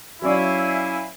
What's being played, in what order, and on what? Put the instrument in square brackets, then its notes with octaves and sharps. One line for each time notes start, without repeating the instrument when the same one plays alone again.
[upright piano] F#3 C#4 D5 [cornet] E4 [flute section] E5 F5 G#5